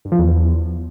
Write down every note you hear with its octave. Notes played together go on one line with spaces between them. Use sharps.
G2
F3
E2